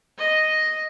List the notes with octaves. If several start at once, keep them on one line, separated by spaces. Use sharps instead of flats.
D#5